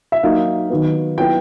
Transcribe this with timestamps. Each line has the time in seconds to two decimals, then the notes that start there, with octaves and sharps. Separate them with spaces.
0.12 E5
0.23 F#3 A#3 D#4 F5
0.70 D#3 F#3 B3
1.18 F#3 B3 E4 G5